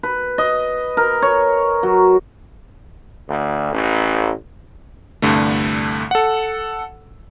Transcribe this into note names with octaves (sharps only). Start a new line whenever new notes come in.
B4
D#5
A#4
C#5
F#3
D2
A1
C2 G2 D3 A3
A4 F#5